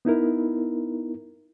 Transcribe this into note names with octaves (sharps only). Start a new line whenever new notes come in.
B3 D#4 E4 A#4